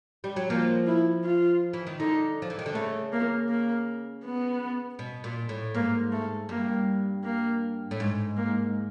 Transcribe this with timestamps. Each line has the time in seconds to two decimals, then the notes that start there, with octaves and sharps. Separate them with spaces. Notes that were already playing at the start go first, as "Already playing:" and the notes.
0.24 G3
0.36 F#3
0.50 F3 A#3
0.87 E4
1.24 F4
1.73 E3
1.87 D#3
1.99 D3 D#4
2.42 F3
2.50 E3
2.59 D#3
2.66 D3
2.75 C#3 A3
3.12 A#3
3.49 A#3
4.25 B3
4.99 B2
5.24 A#2
5.49 A2
5.75 G#2 A#3
6.12 A3
6.49 G2 A#3
7.24 A#3
7.91 A2
8.00 G#2
8.37 A#3